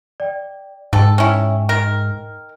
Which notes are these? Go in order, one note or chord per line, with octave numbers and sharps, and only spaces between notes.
D5 G5
G#2 A4 G5 A5
C#4 E4 G5
D#3 A#4